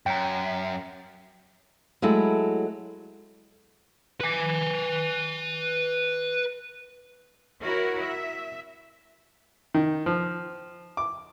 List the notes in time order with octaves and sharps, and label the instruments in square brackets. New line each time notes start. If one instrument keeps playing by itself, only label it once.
[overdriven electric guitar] F#2 [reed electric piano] G5 A#5
[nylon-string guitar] F#3 G#3 A3 E4
[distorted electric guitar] B4 G#5
[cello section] E4 F#4 A#4 C#5
E5
[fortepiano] D#3
F3
D6